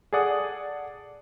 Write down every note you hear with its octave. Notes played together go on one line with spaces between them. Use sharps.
G#4 A4 D5 F#5 D#6